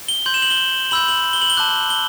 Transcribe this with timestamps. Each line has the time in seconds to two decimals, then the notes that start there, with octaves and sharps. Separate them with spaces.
0.08 G7
0.26 C6 G6 F#7
0.34 E7
0.42 F#7
0.50 G7
0.91 B5 E6 G6 F#7
1.08 F#7
1.33 G7
1.42 F#7
1.50 G7
1.57 A5 D6 F#6
1.90 G7